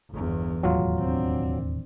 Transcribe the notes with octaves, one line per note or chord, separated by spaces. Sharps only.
G1 E2
E1 D#2 A2 F#3 F4
C4 D4